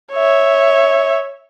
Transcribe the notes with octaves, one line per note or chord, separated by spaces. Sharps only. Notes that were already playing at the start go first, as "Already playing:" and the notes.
C#5 E5